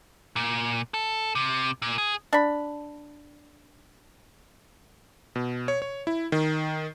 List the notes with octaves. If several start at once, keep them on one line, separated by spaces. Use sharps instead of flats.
A#2
A4
C3
A#2
G#4
D4 B5
B2
C#5
C#5
E4
D#3